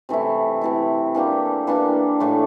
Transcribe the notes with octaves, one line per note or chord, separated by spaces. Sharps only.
C3 E3 A3 E4
C3 E3 A3 E4
E3 A#3 D4 G4
E3 A#3 D4 G4
A2 E3 A3